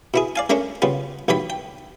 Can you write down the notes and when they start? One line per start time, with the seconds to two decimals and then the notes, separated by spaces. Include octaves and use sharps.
0.14 B2 E4 G#4
0.36 D5 F5 G#5
0.50 G#3 A3 C#4 D4 A#4
0.82 C#3 G3 B3 F4
1.28 B1 E2 E3 G3 G5 B5
1.50 G5